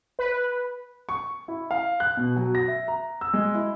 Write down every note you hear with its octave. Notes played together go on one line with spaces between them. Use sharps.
B4
C#6
E4
F5
F#6
B2
F#3
A#6
E5
A#5
E6
G#3
E4